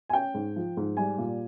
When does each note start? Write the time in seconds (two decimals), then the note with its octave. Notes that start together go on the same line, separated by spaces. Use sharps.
0.09 G#5
0.13 C#4 G5
0.34 G#2
0.56 F3
0.77 G#2
0.97 G3 G#5
1.18 A#2